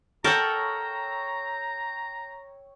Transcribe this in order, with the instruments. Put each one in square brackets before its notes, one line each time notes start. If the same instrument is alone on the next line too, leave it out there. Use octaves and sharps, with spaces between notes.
[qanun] A4 F#5 [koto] A#4 [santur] C#5 G5 E6 [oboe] A#5